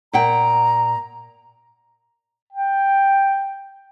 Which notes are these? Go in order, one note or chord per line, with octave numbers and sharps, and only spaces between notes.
A#2 F#5 G5 A#5
G5